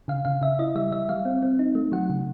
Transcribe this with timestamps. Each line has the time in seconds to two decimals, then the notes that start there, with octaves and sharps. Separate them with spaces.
0.08 C#3 F5
0.25 C#3 F5
0.41 C#3 E5
0.59 E4 D#5
0.75 G3 E5
0.92 G3 E5
1.09 G3 F5
1.25 C4
1.43 C4
1.59 D#4
1.75 A3
1.92 F#3 F#5
2.10 C#3